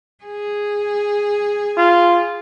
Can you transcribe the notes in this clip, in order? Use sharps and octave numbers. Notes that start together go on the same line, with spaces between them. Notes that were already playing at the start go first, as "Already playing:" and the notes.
G#4
F4